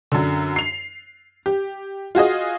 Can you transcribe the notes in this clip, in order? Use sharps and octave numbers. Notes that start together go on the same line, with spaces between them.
F#2 D3
C7 F7
G4
F4 F#4 G#4 D#5